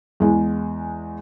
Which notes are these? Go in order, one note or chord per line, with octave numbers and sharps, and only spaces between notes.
E2 G#3